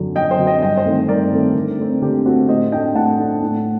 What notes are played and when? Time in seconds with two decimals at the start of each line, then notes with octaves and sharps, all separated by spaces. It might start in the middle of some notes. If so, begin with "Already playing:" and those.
Already playing: F#2 D3 F#3
0.16 F#2 D#5 G5
0.31 C5 D#5
0.38 D3 F#3
0.47 D#5 G5
0.62 G2 D#5 G5
0.77 C5 D#5
0.85 D#3 A3 C4
1.09 G2 A#4 D5
1.32 D#3 A3 C4
1.55 D3
1.79 A3 C4
2.02 D3 G4
2.25 A3 C4 F#4
2.49 A2 C5 D#5
2.72 A3 D4 D#5 G5
2.95 A2 F#5 A5
3.19 A3 D4
3.41 A2